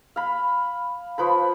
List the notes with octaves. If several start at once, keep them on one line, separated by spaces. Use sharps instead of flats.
F5 B5
F3 B4 B5